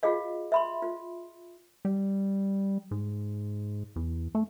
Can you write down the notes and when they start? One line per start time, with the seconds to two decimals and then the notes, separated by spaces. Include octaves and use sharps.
0.03 F4 F#4 G#4 D#5 F5
0.52 E5 B5 C6
0.82 F4
1.85 G3
2.91 G#2
3.96 E2
4.35 A3